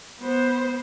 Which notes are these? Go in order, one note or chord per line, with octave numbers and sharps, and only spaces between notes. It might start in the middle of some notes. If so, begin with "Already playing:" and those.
B3 C5